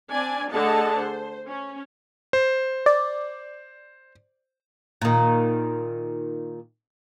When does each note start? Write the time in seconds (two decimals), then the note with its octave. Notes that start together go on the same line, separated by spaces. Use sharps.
0.11 C4 D4 D5 G#5
0.53 D3 A3 G#4 D#5 F#5 A5
1.01 C5
1.47 C#4
2.33 C5
2.86 D5
5.02 A#2 D#3